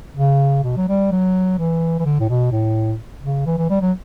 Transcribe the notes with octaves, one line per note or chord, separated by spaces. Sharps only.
C#3
B2
F#3
G3
F#3
E3
E3
D3
A2
B2
A2
C#3
E3
E3
G3
F#3